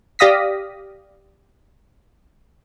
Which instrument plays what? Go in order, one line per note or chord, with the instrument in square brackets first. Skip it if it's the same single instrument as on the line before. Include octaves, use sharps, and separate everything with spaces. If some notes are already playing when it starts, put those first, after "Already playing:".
[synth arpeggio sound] G4 D5 F5 D#6 A#6 B6